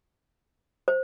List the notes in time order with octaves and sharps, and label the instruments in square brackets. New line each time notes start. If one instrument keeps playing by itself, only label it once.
[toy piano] C5